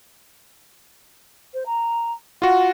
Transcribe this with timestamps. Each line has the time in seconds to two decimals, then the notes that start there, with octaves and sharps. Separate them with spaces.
1.53 C5
1.66 A#5
2.42 F4 F#4 F#5